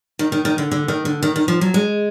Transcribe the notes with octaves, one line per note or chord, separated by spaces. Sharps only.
D#3
D#3
D#3
D3
D3
D#3
D3
D#3
D#3
F3
F#3
G#3